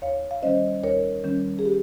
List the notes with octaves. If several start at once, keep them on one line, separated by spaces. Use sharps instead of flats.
D#2 C#5 F5
F5
D#3 G3 C#4 C5 D#5
D#2 A#4 C#5
D#3 G3 C#4
G#4
G4